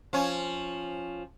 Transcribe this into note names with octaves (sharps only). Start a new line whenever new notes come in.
F3 C#4